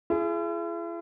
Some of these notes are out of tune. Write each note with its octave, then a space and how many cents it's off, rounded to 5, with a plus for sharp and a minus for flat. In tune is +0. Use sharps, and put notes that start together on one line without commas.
E4 +45 G#4 +20